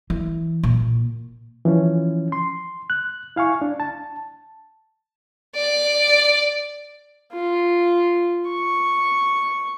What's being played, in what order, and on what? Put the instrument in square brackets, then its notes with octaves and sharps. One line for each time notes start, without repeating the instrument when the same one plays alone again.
[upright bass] E3
A#2
[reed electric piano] E3 F3 C#4
C6
F#6
E4 F5 G#5 C#6
D4
A5
[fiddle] D5
[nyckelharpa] F4
C#6